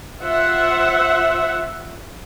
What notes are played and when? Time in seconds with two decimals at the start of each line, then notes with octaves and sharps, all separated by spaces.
0.22 F4 C5 E5 F#5